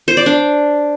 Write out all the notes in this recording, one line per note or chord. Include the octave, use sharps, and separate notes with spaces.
C5
D5
D4